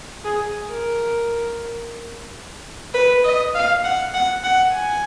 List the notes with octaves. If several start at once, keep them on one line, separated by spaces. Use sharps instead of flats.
G#4
A#4
B4
D#5
F5
F#5
F#5
F#5
G#5